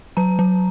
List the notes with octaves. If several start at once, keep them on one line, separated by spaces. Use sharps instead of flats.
F#3 A#5
F#3